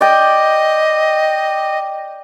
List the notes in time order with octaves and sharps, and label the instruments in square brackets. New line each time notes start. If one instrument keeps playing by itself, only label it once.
[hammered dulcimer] D5 G5 [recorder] D#5